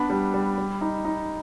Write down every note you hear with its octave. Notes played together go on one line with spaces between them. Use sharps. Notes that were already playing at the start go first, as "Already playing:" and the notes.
Already playing: B3 D4 B5
G3
G3
G3
D#4
D#4